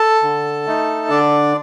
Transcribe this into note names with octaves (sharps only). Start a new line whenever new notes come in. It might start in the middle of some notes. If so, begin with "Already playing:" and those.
Already playing: A4 A5
D3
A3 D#4
D3 D4 D5